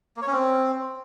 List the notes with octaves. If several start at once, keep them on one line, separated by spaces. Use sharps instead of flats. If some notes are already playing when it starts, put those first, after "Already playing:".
A#3
C#5
C#4
C4